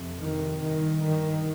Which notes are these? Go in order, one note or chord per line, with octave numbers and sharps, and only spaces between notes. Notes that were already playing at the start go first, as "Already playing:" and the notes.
Already playing: F2 C3
D#3
G2 D#3
D#3